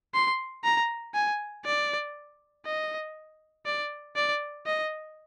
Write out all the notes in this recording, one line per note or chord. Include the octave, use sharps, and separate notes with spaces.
C6
A#5
G#5
D5
D#5
D5
D5
D#5